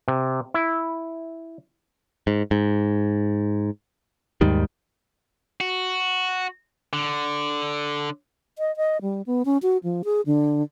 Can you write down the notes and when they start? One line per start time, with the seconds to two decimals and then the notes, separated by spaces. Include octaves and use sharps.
0.08 C3
0.54 E4
2.27 G#2
2.51 G#2
4.41 D#2 G#2 D#3 G3
5.61 F#4
6.93 D3
8.59 D#5
8.77 D#5
9.02 G3
9.26 B3
9.45 C#4
9.63 F#4
9.84 F3
10.04 G#4
10.26 D3